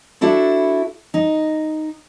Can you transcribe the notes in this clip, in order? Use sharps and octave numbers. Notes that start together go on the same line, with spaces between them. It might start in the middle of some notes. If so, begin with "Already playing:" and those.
D4 E4 F#4 A4
D#4